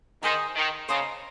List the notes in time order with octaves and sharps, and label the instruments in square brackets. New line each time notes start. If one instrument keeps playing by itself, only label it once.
[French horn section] D#3 [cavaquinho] D#4 G#4 C5 D#5
[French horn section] D#3
[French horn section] C#3 [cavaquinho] C5 D#5 A#5 D#6